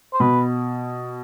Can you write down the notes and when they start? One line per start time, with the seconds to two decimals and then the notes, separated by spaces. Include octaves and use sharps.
0.14 C5
0.20 B2 B4